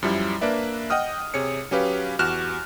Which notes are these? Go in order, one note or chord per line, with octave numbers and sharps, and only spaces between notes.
F#2 F3 G3 E4
A#3 D4 B4 D5 E5
D#5 F#5 G5 D#6 F6
C3 G#4 C#5 C#7
F#3 C#4 G4 B4 F5
E2 F#4 G4 F6 F#6 E7